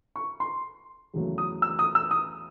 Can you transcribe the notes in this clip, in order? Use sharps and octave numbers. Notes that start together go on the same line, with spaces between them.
C#6
C6
E2 C#3 F#3 A3
D#6
E6
D#6
E6
D#6